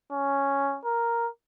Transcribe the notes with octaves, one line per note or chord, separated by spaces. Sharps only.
C#4
A#4